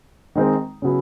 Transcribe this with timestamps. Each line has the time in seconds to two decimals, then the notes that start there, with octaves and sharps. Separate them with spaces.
0.35 D#3 G#3 C4 D#4
0.82 C#3 F#3 B3 E4